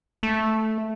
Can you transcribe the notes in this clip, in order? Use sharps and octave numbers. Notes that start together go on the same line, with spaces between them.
A3